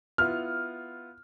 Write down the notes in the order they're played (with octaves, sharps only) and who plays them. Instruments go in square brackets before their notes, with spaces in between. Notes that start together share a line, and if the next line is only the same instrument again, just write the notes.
[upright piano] B3 E4 F4 [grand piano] F6